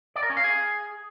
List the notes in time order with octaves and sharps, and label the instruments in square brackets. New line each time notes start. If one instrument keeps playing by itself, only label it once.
[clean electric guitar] D5
A#4
C#4
F5
G#4